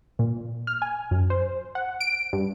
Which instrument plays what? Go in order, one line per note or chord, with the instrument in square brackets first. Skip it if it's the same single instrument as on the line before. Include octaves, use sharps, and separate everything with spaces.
[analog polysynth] A#2
F6
G#5
F#2
C5
F#5
D7
G2